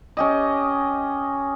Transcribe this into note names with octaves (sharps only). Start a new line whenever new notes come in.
C#4 G4 D#5